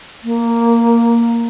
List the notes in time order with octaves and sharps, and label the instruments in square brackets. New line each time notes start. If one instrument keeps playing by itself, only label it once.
[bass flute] A#3